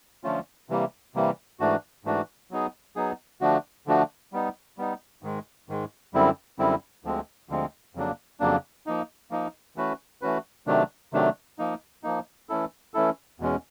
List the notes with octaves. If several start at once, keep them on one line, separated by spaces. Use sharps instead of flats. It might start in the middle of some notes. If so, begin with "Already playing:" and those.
D3 F3 A3 C#4 F4
C3 E3 G3 A#3
C3 E3 G3 A#3
G#2 E3 A3 D4 F#4
G#2 E3 A3 D4 F#4
F#3 B3 D#4 G#4
F#3 B3 D#4 G#4
D3 F3 A3 D4 F#4
D3 F3 A3 D4 F#4
G3 B3 D#4
G3 B3 D#4
G#2 D#3 G#3
G#2 D#3 G#3
F#2 D3 G3 C4 E4
F#2 D3 G3 C4 E4
D2 D3 F3 G#3 C4
D2 D3 F3 G#3 C4
F2 C#3 F#3 A#3 D4
F2 C#3 F#3 A#3 D4
F3 A#3 D#4
F3 A#3 D#4
E3 A3 C#4 F#4 B4
E3 A3 C#4 F#4 B4
C3 D#3 F#3 A3 D4
C3 D#3 F#3 A3 D4
F3 A#3 D#4
F3 A#3 D#4
E3 A3 C#4 E4 A4
E3 A3 C#4 E4 A4
E2 B2 G#3 C#4